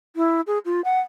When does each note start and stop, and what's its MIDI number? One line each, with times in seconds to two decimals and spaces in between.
0.16 0.41 64
0.47 0.58 68
0.65 0.81 65
0.84 1.00 78